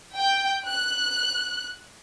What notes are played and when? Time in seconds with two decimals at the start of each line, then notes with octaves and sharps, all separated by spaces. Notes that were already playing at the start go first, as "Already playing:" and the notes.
0.16 G5
0.67 F#6